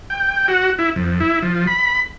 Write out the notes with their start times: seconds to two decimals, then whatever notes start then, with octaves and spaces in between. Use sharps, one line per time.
0.10 G5
0.48 F#4
0.78 E4
0.96 F2
1.20 E4
1.42 F3
1.67 B5